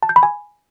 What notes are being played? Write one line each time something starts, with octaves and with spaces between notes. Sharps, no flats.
A5
G6
B5
G#5